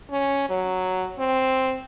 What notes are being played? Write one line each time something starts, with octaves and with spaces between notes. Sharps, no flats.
C#4
F#3
C4